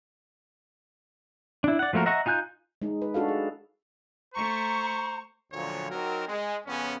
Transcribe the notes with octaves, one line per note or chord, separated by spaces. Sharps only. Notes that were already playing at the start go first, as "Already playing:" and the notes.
D4 E4
D5 F#5
F3 A3 A#3 F#4 A#4
D#5 E5 F#5 A#5 C#6
D#4 F4 G#5 F#6 G6
G#3 D#4
B4
D4 F#4 A4 F5
G#4
A3 C5 A#5 C#6
D2 A#2 D3 F3 F#3 C#5
F#3 C4 D#4 F#4 A#4
G#3
F2 C#3 B3 C#4